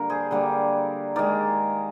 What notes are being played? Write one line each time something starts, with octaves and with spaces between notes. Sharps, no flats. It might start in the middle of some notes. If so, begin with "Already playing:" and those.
Already playing: D3 G3 A#3 A#4
G#4 C5
D3 G3 A#3
D#3 G#3 A#4 D5